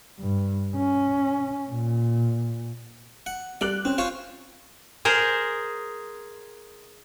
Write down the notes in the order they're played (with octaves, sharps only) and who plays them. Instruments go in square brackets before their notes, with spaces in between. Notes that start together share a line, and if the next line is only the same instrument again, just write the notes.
[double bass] G2
C#4
A#2
[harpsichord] F#5
[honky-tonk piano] G3 F#6 F#7 [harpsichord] D5
[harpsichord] C4 [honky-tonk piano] C#4
[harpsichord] F4 C5 C#5
[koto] G#4 A#4 C5